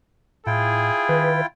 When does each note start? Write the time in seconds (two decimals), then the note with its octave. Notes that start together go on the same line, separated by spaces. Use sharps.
0.46 A2 E4 F4 G#4 G5
1.09 D#3 B4